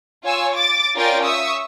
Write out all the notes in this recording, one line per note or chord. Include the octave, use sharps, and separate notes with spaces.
F4 C#5 G#5 E6
D6 A6
C#4 F4 A#4 D5 G5 A6
E5 C#6 D#6 E6